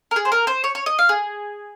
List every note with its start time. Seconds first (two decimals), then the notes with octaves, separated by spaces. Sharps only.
0.11 A#4
0.16 G#4
0.25 C5
0.32 A#4
0.47 C5
0.64 C#5
0.75 C#5
0.86 D#5
0.99 F5
1.09 G#4